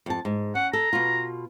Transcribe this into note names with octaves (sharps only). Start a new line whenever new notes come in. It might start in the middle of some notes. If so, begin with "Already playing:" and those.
F2 A5
G#2
C#4 F#5
A4 A#5
B2 F4